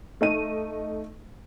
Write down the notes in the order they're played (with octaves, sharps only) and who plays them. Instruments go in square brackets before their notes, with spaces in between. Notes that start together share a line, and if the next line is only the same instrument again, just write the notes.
[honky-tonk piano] A3 D#4 D#7